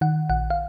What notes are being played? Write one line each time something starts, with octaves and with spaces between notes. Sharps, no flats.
D#3 F#5
A#1 F#5
F5